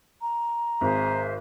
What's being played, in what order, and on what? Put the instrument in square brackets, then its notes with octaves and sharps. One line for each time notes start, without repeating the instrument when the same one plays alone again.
[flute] A#5
[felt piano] G#1 [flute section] G#4 C5 E5